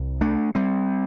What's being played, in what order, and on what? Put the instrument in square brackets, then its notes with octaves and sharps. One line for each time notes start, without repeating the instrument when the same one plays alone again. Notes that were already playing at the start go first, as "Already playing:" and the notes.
Already playing: [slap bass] C2
A3 D4
G3 C4